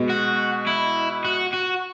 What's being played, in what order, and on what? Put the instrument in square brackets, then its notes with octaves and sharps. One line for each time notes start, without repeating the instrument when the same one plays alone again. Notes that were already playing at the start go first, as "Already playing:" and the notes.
Already playing: [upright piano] B2 G#3 B3
[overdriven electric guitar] F#4
E4
F#4
F#4